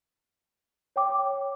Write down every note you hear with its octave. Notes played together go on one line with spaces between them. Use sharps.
C#5 G5 D6